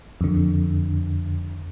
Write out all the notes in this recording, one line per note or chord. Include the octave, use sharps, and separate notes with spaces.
F2 D3